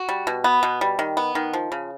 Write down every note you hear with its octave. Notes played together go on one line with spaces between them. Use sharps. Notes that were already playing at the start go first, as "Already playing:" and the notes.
Already playing: F#4
G3
B2
B3
B2
G3
D#3
B3
D#3
F3
C#3